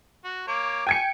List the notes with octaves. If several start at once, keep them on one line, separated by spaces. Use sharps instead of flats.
F#4
A#3 C#5 D6
G5 G#5 G#6 C#7